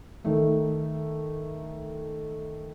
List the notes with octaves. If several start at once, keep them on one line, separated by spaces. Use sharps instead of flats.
D#3 A3